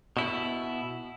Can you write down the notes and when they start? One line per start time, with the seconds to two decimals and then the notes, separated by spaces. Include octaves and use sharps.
0.17 B2 E4